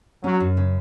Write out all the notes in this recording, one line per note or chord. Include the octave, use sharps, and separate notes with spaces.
F#3 C#4
F#2
C#3